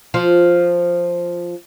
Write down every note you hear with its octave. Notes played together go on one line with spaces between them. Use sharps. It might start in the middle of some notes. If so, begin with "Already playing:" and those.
F3 F4